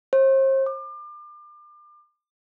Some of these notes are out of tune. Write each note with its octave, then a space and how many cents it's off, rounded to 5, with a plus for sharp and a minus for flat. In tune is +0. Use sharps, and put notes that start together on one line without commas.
C5 +40
D6 +35